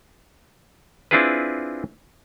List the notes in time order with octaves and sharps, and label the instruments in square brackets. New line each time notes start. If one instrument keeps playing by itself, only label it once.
[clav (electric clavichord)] C4 D4 E4 F4 G#4 B4